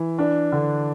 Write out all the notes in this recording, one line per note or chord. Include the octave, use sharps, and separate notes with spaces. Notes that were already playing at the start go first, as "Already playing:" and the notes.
Already playing: E3
D4
D3